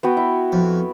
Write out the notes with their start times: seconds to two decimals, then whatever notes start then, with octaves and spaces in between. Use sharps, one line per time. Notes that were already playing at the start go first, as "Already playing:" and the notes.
0.03 B3 F#4 G5
0.17 E4
0.52 F2